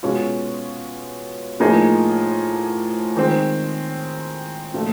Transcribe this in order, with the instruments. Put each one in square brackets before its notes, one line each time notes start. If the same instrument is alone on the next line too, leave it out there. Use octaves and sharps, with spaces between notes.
[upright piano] B2 G#3 C#4 F4
A2 F3 A#3 D#4 G#4
D#3 G#3 C4
A#2 F3 A3